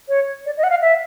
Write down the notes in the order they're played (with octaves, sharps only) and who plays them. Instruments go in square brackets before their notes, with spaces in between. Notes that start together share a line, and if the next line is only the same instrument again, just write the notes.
[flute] C#5
D5
D#5
F#5
F5
E5